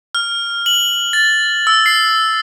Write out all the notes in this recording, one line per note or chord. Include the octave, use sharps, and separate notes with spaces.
F6
F#7
A6
E6
C7